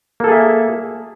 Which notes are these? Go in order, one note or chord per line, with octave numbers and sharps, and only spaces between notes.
A#3 G#4 A4 E5